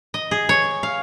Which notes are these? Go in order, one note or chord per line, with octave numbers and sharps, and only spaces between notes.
D#5
G#4
C#5
F5